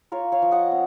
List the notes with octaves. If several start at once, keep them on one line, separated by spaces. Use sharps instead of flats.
F4 A#4 C#5
C#5 F5
F3
D#5 F#5
C4